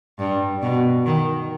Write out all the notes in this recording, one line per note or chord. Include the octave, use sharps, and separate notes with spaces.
G2
B2
D#3